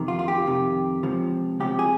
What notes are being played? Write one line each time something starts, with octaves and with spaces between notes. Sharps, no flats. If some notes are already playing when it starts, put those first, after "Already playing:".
Already playing: F2 C3 D#3
F4
F4
G4
F2 C3 D#3
C#2 C3 F3
C#2 C3 F3 G4
G#4